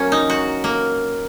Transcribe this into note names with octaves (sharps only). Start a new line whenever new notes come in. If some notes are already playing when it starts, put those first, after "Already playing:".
Already playing: F#3 A#3 C#4
D#4
F#4
A#3